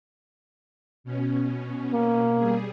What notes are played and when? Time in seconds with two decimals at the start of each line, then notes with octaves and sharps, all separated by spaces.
1.04 B2 C#4
1.93 A#3
2.37 G3 G#4